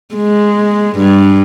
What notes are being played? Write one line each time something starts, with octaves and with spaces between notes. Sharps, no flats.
G#3
G2